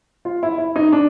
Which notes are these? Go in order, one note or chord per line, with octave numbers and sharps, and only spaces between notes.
F4
E4
E4
D#4
D4